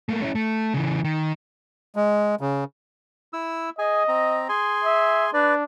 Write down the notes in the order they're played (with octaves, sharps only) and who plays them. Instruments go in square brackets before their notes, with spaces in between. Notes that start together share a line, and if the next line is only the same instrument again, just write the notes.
[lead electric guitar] A3 A#3
C#4 E4
A3
C#3 E3
D#3
[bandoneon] G#3
C#3
[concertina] E4 E6
[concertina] G#4 G#5 [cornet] D#5
[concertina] C4 A#5
G#4 G#5 C6
[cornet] E5
[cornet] D4 [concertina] B4 D5